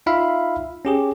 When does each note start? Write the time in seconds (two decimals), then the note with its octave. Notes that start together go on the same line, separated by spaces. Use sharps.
0.06 D#4 F4 E5 F5 B5
0.85 C#4 G4 G#4